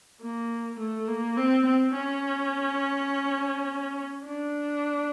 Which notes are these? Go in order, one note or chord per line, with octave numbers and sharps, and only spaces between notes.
A#3
A3
A#3
C4
C4
C#4
D4